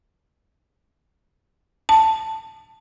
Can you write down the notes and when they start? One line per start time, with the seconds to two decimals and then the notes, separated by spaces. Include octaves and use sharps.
1.89 A5